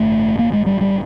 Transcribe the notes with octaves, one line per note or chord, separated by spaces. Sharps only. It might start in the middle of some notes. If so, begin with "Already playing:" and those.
Already playing: A1 G2 D3 A3
A#3
G#3
G3
G3